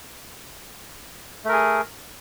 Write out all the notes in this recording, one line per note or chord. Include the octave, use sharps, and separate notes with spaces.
A3 G#4 A#4